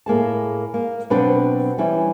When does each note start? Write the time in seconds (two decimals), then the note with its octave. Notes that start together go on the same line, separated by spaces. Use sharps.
0.06 A2 A#3 G#4 A5
0.74 A#3
1.10 B2 F#3 C4 D4 B4 C5
1.78 E3 G3 C#4 E4